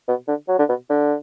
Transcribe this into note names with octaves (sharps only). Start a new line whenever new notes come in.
B2
D3
F#3
D3
B2
D3